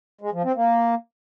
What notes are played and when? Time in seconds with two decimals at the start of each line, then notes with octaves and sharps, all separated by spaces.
0.21 G#3
0.33 F3
0.44 C4
0.56 A#3